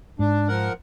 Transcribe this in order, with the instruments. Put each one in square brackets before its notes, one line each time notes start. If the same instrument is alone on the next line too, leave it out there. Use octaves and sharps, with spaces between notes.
[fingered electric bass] G#2 [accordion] D4
[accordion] F3 A#4 F#5